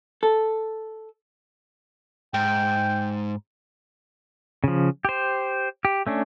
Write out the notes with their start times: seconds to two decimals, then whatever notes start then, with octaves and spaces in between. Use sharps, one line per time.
0.23 A4
2.34 G#2 G5
4.64 C#3 F3
5.05 G4 C5
5.85 G4
6.07 A3 C#4 D4